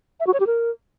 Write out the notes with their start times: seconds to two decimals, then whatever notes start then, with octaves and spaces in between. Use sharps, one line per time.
0.20 E5
0.27 F#4
0.33 C#5
0.40 G4
0.47 A#4